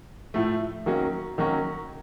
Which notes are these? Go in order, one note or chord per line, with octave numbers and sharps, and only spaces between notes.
A2 F3 A3
D#3 F#3 A#3 C#4 F#4
D#3 F#3 A#3 C#4 F#4